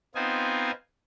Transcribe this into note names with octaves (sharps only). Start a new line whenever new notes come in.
B3 C4 D#4 F4 C5 G#5